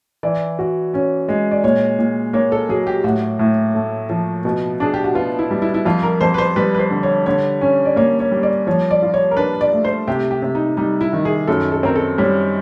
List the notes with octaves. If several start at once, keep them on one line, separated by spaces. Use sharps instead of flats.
E3 D5
F#4
C#4
G#3
D5
A#2 C#5
A#2
A#3 C#5
A4
F#3 G#4
G4
A2 F#4
A2
A3
F3
B2
D4 G#4
G4
F#4
B3 F4
E4
G3
E4
E4
F2 F4
A#4
F2 C5
B4
C5
G3 B4
B4
C5
D3
C#5
D3 C#5
C#4
D5
A#3 C#5
C#5
G3
D5
F3 C#5
D5
F4
C#5
A#4
D4 B4
D5
A3
C5
C3 G4
G4
C3
D#4
G3 D#4
E4
D#3
G#4
F#2 A4
A4
C4 A#4
A4
G3 C#5